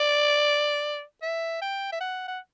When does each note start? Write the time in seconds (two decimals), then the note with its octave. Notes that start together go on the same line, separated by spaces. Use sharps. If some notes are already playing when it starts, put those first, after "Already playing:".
Already playing: D5
1.22 E5
1.62 G5
1.92 E5
2.00 F#5
2.28 F#5